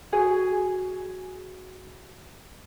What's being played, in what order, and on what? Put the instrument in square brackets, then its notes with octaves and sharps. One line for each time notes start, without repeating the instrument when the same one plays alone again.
[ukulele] F#4 G#4 G#5